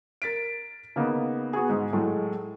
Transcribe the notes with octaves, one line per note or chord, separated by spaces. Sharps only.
A#4 A6 B6 D7
C#3 A#3 B3 D#4
B3 F#4 G#4
G#2
A2 F#3 G#3 A3